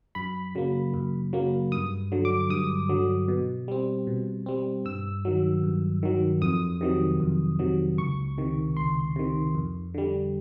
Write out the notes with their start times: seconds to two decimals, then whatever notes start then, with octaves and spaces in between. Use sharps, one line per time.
0.15 F#2 B5
0.55 C#3 F#3 A#3
0.94 F#2
1.33 C#3 F#3 A#3
1.72 G2 D#6
2.12 D3 F#3
2.25 D6
2.50 G2 D#6
2.89 D3 F#3
3.28 B2
3.68 G3 C4
4.07 B2
4.46 G3 C4
4.85 G2 E6
5.25 D#3 F#3
5.63 G2
6.03 D#3 F#3
6.41 F2 D#6
6.81 C3 D#3 F#3
7.20 F2
7.59 C3 D#3 F#3
7.98 C#2 C#6
8.38 C3 D#3
8.77 C#2 C6
9.16 C3 D#3
9.55 F2
9.94 D3 G3